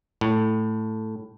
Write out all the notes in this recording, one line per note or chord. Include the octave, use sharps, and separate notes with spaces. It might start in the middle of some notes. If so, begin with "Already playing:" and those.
A2